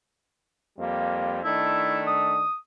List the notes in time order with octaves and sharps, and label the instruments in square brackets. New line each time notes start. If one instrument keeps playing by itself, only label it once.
[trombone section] F2 G3 A#3
[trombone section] D#3 A3 D4 [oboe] E4
[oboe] D#6